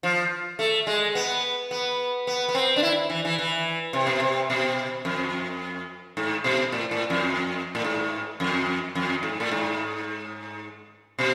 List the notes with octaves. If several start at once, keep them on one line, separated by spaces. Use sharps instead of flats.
F3
A3
G#3
B3
B3
B3
B3
C4
D4
E4
E3
E3
E3
C3
B2
C3
B2
F2
G#2
B2
A2
A2
F2
A2
G#2
F2
F2
G#2
A2
G#2
B2